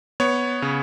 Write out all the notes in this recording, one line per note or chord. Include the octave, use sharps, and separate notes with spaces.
B3 C#5
C#3